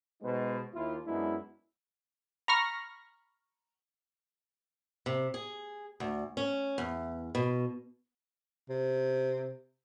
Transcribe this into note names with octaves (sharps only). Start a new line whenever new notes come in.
B2 G#3 B3 D#4 B4 C5
D#2 E4 F4
F#2 G#3 B3 D4 E4
A#5 B5 C#6 F6 A#6
C3
G#4
D2
C#4
E2
B2
C3